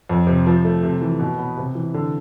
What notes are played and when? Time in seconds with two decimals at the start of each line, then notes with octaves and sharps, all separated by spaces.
0.09 F2
0.27 C3
0.47 F3
0.65 A3
0.83 C3
1.01 E3
1.20 B2
1.38 B3
1.57 C3
1.75 E3
1.94 D3